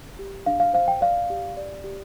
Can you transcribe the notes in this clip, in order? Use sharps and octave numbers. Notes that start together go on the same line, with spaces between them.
G4
D4 F5
F5
C5 F5
G5
D5 F5
G4
D5
G4